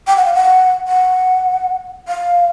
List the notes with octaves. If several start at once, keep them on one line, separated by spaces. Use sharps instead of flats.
G5
F#5
F5
F#5
F#5
F5